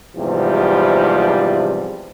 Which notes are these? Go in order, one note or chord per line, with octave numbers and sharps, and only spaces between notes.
E2 G#2 C3 F3 G3 C4